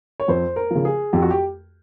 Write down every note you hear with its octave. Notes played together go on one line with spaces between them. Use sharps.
C#5
F2 C5
A#4
C#3 F3
G#4
F2 G4
F#4
G4